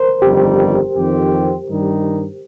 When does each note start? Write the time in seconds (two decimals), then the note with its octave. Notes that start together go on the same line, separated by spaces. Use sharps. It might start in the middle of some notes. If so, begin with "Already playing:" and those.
Already playing: A#4 C5
0.21 G1 F2 D#3 G3 G4
0.94 F2 D#3 C4 G4
1.68 G2 D#3 G3 D#4